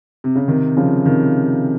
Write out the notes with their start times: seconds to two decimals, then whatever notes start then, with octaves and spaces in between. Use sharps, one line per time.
0.24 C3
0.36 C#3
0.48 C3 D#3
0.77 C#3 F3
1.06 C3 D#3